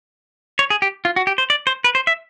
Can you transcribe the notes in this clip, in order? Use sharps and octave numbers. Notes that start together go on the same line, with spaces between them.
C#5
G#4
G4
F4
F#4
G4
C5
D5
C5
B4
C5
E5